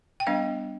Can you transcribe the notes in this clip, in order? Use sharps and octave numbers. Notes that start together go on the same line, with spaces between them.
G5
G3 B3 D4 F5